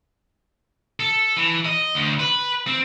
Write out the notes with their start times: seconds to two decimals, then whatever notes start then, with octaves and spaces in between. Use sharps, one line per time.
1.00 A4
1.37 E3
1.66 D#5
1.95 D2
2.20 B4
2.67 C4